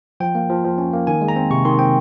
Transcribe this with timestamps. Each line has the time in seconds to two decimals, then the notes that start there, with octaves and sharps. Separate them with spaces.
0.20 F3 G5
0.35 A#3
0.49 F3
0.64 F3
0.78 C#4
0.93 A#3
1.07 D#3 G#5
1.21 G#3
1.28 A#5
1.36 C4
1.51 C3 C#6
1.65 D#3 C6
1.79 C4 G5